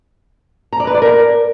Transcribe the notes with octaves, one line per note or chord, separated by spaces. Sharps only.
A#5
D5
B4
D5
A#4